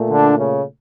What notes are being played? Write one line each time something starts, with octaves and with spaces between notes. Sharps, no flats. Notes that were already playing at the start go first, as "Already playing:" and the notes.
Already playing: A#2 A3
D3 D4
C#3 C#4